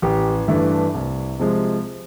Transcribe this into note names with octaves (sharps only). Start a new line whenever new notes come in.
A1 G4
G2 E3 A3 D4
C2
C3 F3 G#3